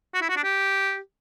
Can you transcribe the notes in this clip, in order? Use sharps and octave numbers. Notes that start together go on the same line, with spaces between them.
F#4
E4
F#4
D4
G4